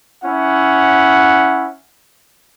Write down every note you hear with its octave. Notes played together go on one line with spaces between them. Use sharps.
C#4 E4 F#5